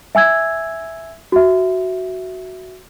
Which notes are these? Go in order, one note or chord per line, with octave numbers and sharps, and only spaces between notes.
E5 G#5 E6 G#6
F#4 E5